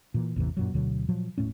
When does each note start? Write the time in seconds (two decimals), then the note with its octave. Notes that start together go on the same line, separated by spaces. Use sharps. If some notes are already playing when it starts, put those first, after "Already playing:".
0.14 A#2 E3
0.36 A1 E2 C3 E3
0.57 F#2 A#2 F#3
0.74 D2 B2 D3 F#3
1.09 A#2 F3 F#3
1.38 D#1 A2 A3 C#4